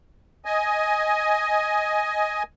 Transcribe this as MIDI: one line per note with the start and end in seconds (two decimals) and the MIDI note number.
0.45 2.43 75
0.45 2.43 80